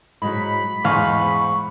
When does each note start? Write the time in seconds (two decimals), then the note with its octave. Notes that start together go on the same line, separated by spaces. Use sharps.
0.22 G#2 F#3 B5
0.85 E2 G#2 C5 F5 G#5 C#6 F6